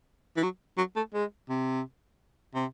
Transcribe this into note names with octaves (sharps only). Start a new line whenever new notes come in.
E3
F#3
F#3
A3
G#3
C3
C3